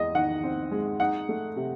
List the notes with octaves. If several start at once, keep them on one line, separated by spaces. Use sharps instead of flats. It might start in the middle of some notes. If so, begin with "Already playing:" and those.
Already playing: E2 G#3 D#5
D#3 F#5
C4
G#3
D#4 F#5
A3
C3